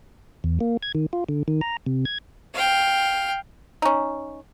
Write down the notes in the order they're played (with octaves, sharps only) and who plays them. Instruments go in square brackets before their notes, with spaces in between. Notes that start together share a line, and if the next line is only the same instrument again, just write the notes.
[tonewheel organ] E2
A#3
G#6
D#3
F4
D3
D#3
A#5
C3
G#6
[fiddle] F5 G5
[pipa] C#4 D#4